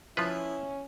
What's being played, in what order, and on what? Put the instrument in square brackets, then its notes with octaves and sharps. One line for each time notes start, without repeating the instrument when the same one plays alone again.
[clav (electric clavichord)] F3 F4 B4 [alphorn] C#4 [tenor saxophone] E4